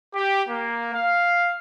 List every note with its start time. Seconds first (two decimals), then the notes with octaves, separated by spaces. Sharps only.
0.14 G4
0.48 A#3
0.94 F5